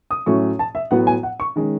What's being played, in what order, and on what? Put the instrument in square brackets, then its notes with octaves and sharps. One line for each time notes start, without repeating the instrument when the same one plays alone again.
[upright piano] D#6
A2 F#3 A3 C#4 C#6
A5
E5
A2 F#3 B3 F#5
G#5
F#5
C#6
D#3 G#3 C#4